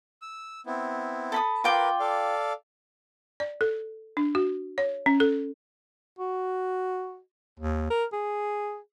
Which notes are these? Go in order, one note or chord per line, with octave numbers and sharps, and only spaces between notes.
E6
B3 C4 E4
A4 B5 D#6
F4 A#4 B4 G5 D6
A4 D5 F5
D5
A4
D4
F#4
C#5
C#4
A4
F#4
D#2
A#4
G#4